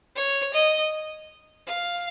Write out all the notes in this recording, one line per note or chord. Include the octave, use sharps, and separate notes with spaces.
C#5
D#5
F5